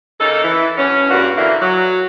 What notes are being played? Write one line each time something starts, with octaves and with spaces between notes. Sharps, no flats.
C#3 A#3 D#4 A4
E3
B2 F#3 C#4
E2 G2 A#3 F#4
A#2 D3 E3 A#3 E4
F#3